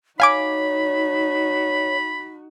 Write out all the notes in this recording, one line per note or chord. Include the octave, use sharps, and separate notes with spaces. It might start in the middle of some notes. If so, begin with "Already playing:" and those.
D#4 F#4 C#5 F5 G#5 B5 D6